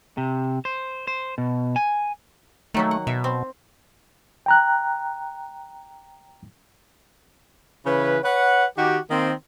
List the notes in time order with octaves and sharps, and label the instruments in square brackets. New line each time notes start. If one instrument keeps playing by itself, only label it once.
[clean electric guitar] C3
C5
C5
B2
G#5
[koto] D#3 F#3 A#3 [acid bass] A3
[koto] F#5
[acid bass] B2 [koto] E5
[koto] C4
[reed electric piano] G5 A#5 F#6
[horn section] C#3 E3 C#4 B4
B4 C#5 F#5
D#3 D#4 F#4 G4
D#3 A#3 C4